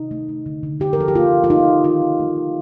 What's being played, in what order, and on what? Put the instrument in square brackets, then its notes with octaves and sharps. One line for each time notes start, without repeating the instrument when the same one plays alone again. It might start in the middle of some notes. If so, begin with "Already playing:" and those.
Already playing: [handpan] C3 D#4
A3
A3
D3
D3
D3 G4
A#4
F3 A4
G4
A#3 F4
D3
F4
A#3 D#4
A#3
D#3 F4
D#3
A3
A3